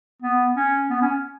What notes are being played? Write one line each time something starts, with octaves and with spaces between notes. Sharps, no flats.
B3
C#4
B3
C#4